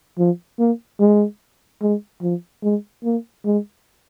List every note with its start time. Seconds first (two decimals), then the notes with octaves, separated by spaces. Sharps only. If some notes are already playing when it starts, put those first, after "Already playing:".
0.18 F3
0.59 A#3
1.00 G#3
1.82 G#3
2.22 F3
2.63 G#3
3.04 A#3
3.45 G#3